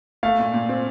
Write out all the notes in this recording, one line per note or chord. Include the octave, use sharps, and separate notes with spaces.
A3 F5
A#2
A#2
C4